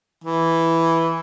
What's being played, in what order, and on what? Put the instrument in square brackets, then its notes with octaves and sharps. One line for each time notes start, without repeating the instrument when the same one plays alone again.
[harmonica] E3